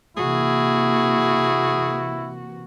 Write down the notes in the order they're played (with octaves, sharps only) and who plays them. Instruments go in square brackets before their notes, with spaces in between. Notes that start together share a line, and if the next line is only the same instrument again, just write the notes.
[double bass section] C3 E3 A#3 [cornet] E4 [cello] F#4 [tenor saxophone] G#4